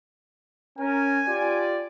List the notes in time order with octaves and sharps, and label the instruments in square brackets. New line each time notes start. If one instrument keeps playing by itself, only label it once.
[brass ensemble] C#4 A#4 [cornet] G#5
[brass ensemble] F4 G4 D5